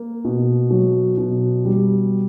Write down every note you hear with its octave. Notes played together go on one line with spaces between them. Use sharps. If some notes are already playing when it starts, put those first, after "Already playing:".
Already playing: A#3
B2
F#3
B2
G3